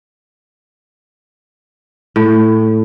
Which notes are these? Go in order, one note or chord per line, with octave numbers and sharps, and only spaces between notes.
A2